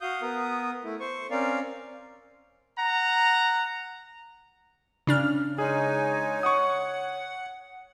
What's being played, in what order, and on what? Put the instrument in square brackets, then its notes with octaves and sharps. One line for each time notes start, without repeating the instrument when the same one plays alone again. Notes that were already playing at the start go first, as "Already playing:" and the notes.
[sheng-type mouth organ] F#4 F5 D#6 G6
B3 A#4 D#6
A3 E4
C5 C#6
C4 C#4 A#4 D5 F5
[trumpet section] F#5 A#5
[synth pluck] C#3 D4 F6
[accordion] G#3 D#4 G#5 [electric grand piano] G#4 [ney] C#5
[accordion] F#5 [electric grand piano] C#6 D#6